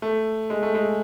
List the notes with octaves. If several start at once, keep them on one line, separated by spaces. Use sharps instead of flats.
A3
G#3
A3
G#3